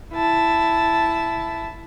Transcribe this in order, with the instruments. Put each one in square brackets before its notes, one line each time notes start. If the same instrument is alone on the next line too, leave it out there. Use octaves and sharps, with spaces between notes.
[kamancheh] E4 A5